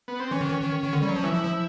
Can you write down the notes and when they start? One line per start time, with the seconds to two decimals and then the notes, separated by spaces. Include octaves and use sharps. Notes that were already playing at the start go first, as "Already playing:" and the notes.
0.08 B3
0.20 C4
0.31 E3 C#4
0.41 D#3
0.50 E3
0.62 D#3
0.84 D#3
0.93 D3
1.02 G3
1.09 F#3
1.16 F3
1.23 E3 E4
1.34 F3
1.45 F3